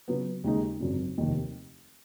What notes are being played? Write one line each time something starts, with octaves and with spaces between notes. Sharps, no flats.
C#3 F#3 B3
D#2 C#3 G#3 D#4
G#1 F#2 C#3
F1 D#2 D#3